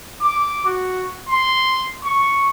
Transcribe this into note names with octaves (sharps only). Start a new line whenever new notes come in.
D6
F#4
C6
C#6